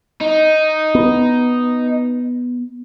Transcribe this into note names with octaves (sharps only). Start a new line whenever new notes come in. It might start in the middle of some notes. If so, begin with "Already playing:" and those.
D#4
B3